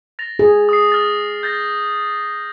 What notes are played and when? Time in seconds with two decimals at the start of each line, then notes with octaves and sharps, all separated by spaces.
0.19 A6 A#6 F7
0.39 G#4
0.69 D#6 C7
0.92 F6 A6
1.43 G6 A6 A#6